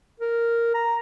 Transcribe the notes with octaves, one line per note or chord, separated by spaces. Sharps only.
A#4
A#5